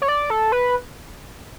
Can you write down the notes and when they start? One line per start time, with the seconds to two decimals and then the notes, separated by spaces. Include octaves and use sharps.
0.02 C#5
0.08 D5
0.30 A4
0.52 B4